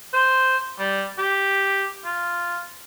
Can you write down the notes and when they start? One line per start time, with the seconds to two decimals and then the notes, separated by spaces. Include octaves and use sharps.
0.14 C5
0.79 G3
1.18 G4
2.04 F4